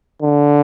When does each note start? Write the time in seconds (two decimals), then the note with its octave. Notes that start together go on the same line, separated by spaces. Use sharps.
0.22 D3